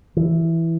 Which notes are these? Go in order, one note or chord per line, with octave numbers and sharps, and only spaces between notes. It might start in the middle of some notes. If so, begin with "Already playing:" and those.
E3